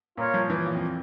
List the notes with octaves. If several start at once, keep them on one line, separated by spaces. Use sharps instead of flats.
A#2 F4 A#4 C#5 F5
F3
E3
A#2
F2